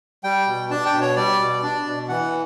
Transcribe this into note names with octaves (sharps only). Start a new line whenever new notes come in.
G3 G5
B2
D4 A5
G5
B2
C#5
G3 D5
B2
D4
B2
E3 F#5